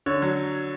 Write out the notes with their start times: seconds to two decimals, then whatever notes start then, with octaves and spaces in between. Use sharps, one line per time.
0.06 D3 C#5
0.22 F#3